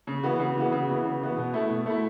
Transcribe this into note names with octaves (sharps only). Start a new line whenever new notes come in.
C#3
E3 B3 F#4
C#3
E3 B3 F#4
C#3
E3 B3 F#4
C#3
E3 B3 F#4
B2
A3 E4
B2
A3 E4